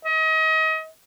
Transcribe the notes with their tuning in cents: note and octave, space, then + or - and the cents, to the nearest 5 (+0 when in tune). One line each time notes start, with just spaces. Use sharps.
D#5 +35